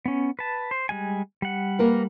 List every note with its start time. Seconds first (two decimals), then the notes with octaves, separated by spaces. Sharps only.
0.06 B3 C#4
0.39 B4 A5
0.71 C5
0.89 G3 G#3 G#5
1.42 G3 F#5
1.79 A#3 A#4 B4